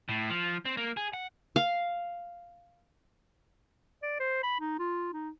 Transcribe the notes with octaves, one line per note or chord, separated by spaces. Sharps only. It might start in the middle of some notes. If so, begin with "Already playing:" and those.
A2
F3
C4
A#3
G#4
F#5
F5
D5
C5
B5
D#4
F4
D#4